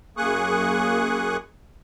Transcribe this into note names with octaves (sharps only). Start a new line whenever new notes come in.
F#2 A#3 G#4 C#6 D#6 F#6